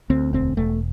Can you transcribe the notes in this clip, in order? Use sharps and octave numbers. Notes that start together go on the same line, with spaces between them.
D2 C4
E1 C4
E1 A3